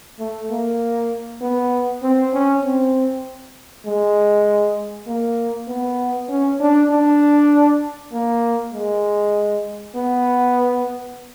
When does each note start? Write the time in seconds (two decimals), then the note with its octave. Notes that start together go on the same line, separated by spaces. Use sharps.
0.19 A3
0.50 A#3
1.41 B3
2.02 C4
2.33 C#4
2.64 C4
3.86 G#3
5.07 A#3
5.68 B3
6.29 C#4
6.60 D4
6.90 D4
8.12 A#3
8.73 G#3
9.95 B3